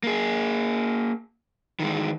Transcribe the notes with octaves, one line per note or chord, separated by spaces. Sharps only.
A#3 G#4
D#3 E3 G#3